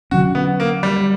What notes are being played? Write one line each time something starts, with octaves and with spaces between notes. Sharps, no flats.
D3 F#3 C#4 F#4
B3
A#3
G3